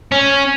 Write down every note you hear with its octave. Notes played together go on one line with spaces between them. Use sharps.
C#4